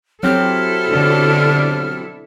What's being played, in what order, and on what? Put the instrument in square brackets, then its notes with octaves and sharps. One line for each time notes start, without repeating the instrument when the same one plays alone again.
[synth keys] F#3 C4 G4 [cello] E4 A4 [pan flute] F6
[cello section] B2 D3 D4